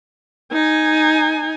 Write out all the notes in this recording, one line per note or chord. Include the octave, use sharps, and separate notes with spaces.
D#4 G#5